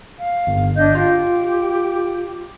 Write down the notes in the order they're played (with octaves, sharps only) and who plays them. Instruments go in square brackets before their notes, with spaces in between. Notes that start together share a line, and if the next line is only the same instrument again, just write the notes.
[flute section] F5
[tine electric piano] G1
[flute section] D4 D#5 G6
[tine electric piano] F4 [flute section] G4